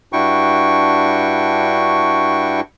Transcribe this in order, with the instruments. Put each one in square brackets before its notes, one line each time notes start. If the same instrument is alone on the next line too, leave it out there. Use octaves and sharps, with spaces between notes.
[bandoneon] G2 D4 E4 F#4 G5 C#6